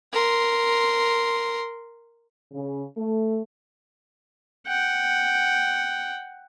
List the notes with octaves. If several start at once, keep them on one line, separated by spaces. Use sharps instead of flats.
A#4 C6
C#3
A3
F#5 G5